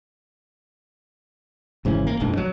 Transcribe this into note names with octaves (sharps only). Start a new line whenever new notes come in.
G#1 G#2 C#3 E3
A#3
F#1 B1 G#2 D4
F#3